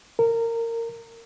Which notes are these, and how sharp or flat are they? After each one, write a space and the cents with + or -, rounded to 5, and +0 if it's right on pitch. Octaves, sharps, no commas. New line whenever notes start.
A#4 -20